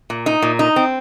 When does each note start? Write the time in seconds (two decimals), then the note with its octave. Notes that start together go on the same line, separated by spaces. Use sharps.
0.10 A#2
0.26 D#4
0.42 A#2
0.59 D#4
0.76 C4